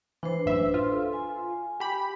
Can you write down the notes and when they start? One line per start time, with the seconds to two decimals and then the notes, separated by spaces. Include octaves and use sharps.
0.23 E3 D4 B4 C5
0.46 A1 F#2 E5
0.74 F4
0.90 A4
1.13 G#5
1.80 G4 B5